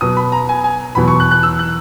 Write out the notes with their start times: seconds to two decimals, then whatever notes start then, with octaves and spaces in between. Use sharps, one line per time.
0.01 B2 F#3 B3 D#6
0.17 B5
0.32 A#5
0.49 G#5
0.64 G#5
0.95 E2 B2 F#3 B3 B5
1.08 C#6
1.20 F#6
1.31 F#6
1.43 E6
1.59 F#6